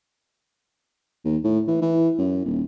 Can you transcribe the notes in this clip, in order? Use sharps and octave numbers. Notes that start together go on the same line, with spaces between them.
D#2
A2
E3
E3
F#2
D#1